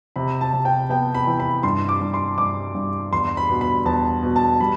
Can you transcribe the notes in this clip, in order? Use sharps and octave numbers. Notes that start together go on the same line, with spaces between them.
C3 B5
A5
C3
G5
B3 G5
B5
E3
B5
G2 C6
D6
G2
C6
G2 D6
G2
E2 C6
B5
B2
B5
E2 A5
B2
A5
G3 B5